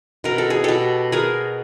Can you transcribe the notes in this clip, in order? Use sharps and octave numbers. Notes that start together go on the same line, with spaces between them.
B2 A#4
A4
G#4
B2 G4 A4
B3 G#4 A#4